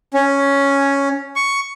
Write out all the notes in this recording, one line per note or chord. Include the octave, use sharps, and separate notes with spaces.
C#4
C#6